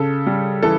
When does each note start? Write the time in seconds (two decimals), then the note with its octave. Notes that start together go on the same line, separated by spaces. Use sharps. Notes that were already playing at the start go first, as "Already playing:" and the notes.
Already playing: C#3 A4
0.27 G3
0.63 E3 A4